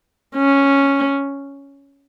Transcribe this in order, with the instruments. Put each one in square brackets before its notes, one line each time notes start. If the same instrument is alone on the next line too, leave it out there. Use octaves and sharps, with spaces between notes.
[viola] C#4